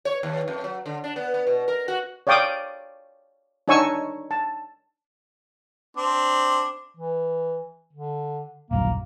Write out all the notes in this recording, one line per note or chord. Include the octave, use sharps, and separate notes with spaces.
C#5
D#2
F2
F#3
D3
D4
B3
B3
B2
A#4
F#4
C#5 D5 F5 G5 D6 D#6
D4 D#4 C#5 G#5 C#6 E6
A5
C4 D4
E3
D3
D#1 A#1 F#2 A#3